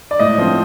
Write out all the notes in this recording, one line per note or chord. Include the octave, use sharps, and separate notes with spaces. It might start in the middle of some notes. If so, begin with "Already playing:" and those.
D5
A2 D#5
F3 C4